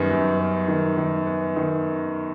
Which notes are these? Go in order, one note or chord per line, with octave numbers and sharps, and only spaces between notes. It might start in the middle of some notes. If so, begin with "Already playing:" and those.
Already playing: F#2 D#3 G3 B3
F#2
B3
D#3
D#3
B3
D#3